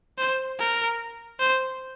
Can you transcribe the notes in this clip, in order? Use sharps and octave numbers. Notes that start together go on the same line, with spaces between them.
C5
A#4
C5